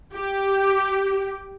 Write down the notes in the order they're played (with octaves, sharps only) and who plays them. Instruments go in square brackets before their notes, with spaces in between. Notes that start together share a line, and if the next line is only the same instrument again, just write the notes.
[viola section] G4